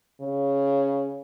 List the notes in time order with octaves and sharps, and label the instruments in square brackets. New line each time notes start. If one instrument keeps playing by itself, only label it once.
[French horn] C#3